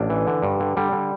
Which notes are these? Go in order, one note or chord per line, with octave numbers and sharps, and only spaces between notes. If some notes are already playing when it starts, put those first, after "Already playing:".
Already playing: A1 D4
E3
D3
G2
D3
D3 G3
D3